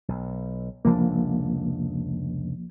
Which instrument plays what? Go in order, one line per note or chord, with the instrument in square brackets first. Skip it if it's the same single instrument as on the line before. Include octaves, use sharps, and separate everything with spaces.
[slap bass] B1
[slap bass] F1 C#2 D4 [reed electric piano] F3 A#3